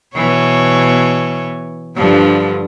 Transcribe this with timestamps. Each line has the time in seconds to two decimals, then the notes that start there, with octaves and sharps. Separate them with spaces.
0.15 B2 E3 C#5
1.96 G2 D3 F3